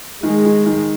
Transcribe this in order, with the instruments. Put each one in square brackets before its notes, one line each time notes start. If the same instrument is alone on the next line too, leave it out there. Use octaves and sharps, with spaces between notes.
[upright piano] D#3 [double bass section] G#3
[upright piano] D#3
D#3